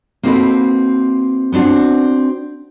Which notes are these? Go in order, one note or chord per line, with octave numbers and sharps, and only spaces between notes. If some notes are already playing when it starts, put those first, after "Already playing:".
A#3 C4 D#4 F#4 A4 B4
B3 C4 D4 F#4